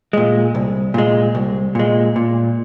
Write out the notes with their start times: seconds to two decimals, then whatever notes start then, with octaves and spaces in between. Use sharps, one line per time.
0.13 A#2 G#3
0.55 C2
0.94 A#2 G#3
1.35 C2
1.75 A#2 G#3
2.16 A#2